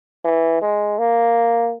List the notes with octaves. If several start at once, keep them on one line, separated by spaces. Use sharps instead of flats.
E3
G#3
A#3